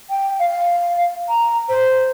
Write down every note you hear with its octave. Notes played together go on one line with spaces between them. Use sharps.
G5
F5
A#5
C5